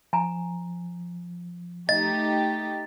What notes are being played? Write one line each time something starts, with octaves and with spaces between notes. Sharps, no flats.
F3 G#5 A#5
A3 D#4 G4 D#5 A6